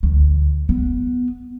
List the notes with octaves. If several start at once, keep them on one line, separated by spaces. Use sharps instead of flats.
D2
B3